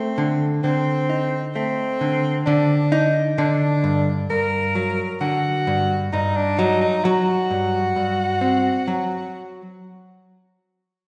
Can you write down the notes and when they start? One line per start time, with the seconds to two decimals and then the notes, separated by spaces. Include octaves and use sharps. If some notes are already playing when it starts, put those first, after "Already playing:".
Already playing: A3 C4
0.18 D3
0.64 D3 C4
1.10 D#4
1.56 A3 C4
2.01 D3
2.46 D3 D4
2.92 D#4
3.38 D3 D4
3.84 G2
4.30 G2 A#4
4.75 F#3
5.21 D3 F#4
5.67 G2
6.13 G2 D#4
6.36 D4
6.59 F#3 D#4
6.81 D#4
7.04 F#3 F#4
7.50 G2
7.96 G2
8.41 C4
8.88 F#3